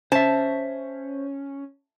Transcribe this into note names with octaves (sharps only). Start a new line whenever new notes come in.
C#4 C5 E5 A5